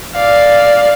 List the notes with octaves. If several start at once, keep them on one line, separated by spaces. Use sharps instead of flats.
D5 F5